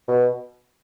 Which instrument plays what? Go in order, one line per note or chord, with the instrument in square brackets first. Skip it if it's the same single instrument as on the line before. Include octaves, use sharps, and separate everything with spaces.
[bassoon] B2